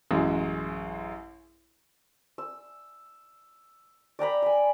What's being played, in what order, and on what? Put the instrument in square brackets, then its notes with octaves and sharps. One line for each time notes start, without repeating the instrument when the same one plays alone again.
[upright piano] A1 F#2 G#3
[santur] E6
D5 G5 A#5 B5
G#5 B5